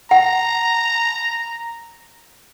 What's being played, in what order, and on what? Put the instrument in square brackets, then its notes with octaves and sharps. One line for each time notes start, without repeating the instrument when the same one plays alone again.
[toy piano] F#5 [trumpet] A#5